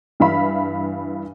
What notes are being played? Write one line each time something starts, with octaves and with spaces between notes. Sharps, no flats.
G2 E3 E5 F5 B5